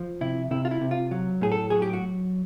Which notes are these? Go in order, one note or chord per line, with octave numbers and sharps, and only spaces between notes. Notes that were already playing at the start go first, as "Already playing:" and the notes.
Already playing: F3
C3 E4
C3 E4
F4
E4
C3
F4
F#3
A2 G#4
A4
F#3 G#4
G4
F#4